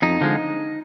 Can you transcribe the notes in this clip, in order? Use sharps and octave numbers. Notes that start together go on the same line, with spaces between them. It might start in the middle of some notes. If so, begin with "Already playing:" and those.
F2 D#4
D3 F3 G#3